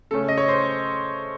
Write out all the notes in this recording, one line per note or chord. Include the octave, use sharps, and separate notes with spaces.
C#3 A3 C#4 A4
D#5
C#5
C5